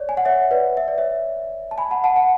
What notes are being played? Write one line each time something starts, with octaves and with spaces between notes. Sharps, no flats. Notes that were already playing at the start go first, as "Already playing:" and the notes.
Already playing: C#5 D5
G#5
F#5
C#5 E5
B4 D5
E5
D5
C#5 E5
A5
G#5 B5
F#5 A5
F#5 A5
F#5 A5